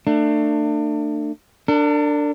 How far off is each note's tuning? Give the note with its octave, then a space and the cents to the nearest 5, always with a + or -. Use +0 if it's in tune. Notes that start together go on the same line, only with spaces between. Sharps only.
A3 +30 D4 +30
D4 +0 A#4 -45